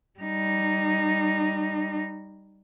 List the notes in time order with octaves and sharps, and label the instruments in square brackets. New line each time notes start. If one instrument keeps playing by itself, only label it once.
[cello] G3 D#4